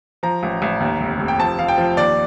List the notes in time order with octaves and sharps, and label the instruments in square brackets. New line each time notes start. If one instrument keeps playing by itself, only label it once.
[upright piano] F3 A#5
A1
A1
D#2
F1
F1
G5
F3 A5
F3 F5
G5
F3
D#2 D5